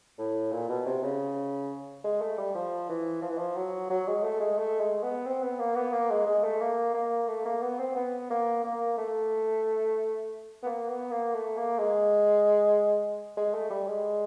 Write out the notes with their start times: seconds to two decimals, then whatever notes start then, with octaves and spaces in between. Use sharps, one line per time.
0.19 A2
0.52 A#2
0.69 B2
0.86 C3
1.03 C#3
2.04 G#3
2.21 A3
2.38 G3
2.55 F3
2.89 E3
3.22 F3
3.30 E3
3.38 F3
3.57 F#3
3.90 F#3
4.08 G#3
4.24 A3
4.40 G#3
4.58 A3
4.80 G#3
5.03 B3
5.26 C4
5.43 B3
5.59 A#3
5.76 B3
5.93 A#3
6.11 G#3
6.27 G#3
6.44 A3
6.61 A#3
6.94 A#3
7.28 A3
7.45 A#3
7.62 B3
7.79 C4
7.96 B3
8.30 A#3
8.64 A#3
8.98 A3
10.63 B3
10.66 A#3
10.89 B3
11.11 A#3
11.34 A3
11.57 A#3
11.79 G#3
13.37 G#3
13.54 A3
13.71 G3
13.88 G#3